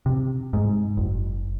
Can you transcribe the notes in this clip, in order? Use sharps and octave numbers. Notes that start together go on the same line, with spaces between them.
C3
G#2
F#1